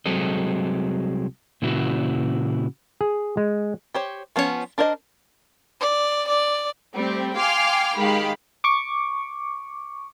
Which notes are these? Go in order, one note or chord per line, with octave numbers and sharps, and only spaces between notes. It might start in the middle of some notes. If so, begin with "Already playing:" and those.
C2 F#3 G#3 C4 A4 D#5
A#2 C#3 E3 E4 F#4
G#4
G#3
G4 C5 C#5
F3 B3 C#4 F4 C#5
D4 A#4 C5 D5 D#5
D5
D5
G3 A3 C4
F5 G5 G#5 C6 D6 F6
D#3 G#3 G4 F5 B5
C#6 D6